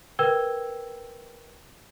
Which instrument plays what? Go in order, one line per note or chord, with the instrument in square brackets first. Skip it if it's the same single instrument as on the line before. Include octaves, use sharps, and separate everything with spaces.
[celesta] A#4 B4 G5 E6 G#6 G7